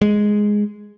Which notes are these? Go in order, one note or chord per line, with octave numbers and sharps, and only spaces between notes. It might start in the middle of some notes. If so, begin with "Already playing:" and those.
G#3